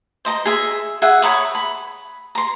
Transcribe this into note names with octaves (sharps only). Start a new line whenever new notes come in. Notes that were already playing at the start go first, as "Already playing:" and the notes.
C5 D#5 A#5
G#4 E5
G#4 E5 F#5
C#5 A#5 B5 D#6
B5
A#5 C6